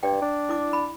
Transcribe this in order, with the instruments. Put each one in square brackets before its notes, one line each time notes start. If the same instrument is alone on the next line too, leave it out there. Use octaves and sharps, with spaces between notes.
[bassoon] G2 [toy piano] D5 G5
[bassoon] D4
[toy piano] E4 D6
B5